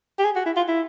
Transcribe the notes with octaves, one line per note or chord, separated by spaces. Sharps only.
G4
G#4
F#4
E4
F4
E4